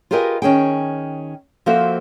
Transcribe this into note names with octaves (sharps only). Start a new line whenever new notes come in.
F4 G4 G#4 A#4 B4 D#5
D#3 C#4 G#4 G5
F3 A#3 C4 F#4 A4 E5